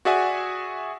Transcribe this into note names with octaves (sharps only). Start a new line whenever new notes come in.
F#4 G#4 D5 E5 F#5 G#5